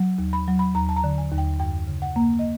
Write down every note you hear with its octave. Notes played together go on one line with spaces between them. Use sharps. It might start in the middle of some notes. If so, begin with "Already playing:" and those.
Already playing: F#3
D#2
B5
F#3
B5
D#2 A#5
A5
A#5
D3
G#5
D#2
G5
F#2 G5
C#3
F#5
A#3
D#5